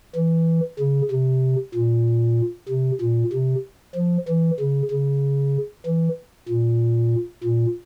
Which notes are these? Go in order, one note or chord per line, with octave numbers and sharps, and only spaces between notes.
E3
C#3
C3
A#2
C3
A#2
C3
F3
E3
C#3
C#3
E3
A#2
A#2